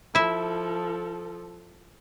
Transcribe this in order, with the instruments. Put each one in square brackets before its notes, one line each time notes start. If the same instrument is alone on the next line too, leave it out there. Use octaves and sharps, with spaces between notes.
[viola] F3 A4 [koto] E4 E5